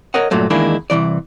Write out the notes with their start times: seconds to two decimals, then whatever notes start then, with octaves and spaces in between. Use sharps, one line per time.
0.14 A#4 C#5 D#5 F#5
0.31 G2 A#2 F#3 A3
0.50 E2 D#3 G#3 A#3 D4 E4
0.90 C2 B2 E3 D5